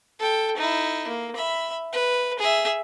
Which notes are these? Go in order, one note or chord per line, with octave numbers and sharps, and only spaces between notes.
A4 G5
D#4 E4
A#3
E5 B5
B4
G#4 E5